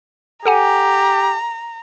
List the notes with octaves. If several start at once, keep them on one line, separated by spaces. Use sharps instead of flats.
G4 A4 F#5 G#5 A#5